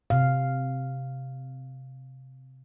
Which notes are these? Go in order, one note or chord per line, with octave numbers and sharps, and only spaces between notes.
C3 F5